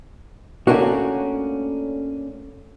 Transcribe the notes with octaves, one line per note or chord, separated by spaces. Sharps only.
A3 A#3 C#4 D4 F#4